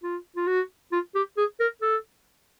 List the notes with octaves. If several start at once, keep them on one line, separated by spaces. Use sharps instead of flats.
F4
F4
F#4
F4
G4
G#4
A#4
A4